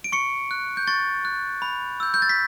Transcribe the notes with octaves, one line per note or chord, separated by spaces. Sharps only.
D7
C#6 C#7
F#6
G6
C#6 A6
F#6
B5
E6 G6
G6
A6
B6